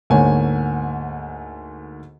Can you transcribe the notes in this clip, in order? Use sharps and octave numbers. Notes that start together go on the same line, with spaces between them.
D2 G#2 A#3 C#5 G#5